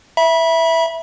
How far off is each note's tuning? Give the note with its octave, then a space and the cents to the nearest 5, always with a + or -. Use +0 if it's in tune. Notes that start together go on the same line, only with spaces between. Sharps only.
E5 +0 B5 -35